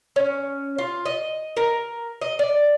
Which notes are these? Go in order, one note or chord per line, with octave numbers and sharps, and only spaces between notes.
C#4
F4
D#5
A#4
D#5
D5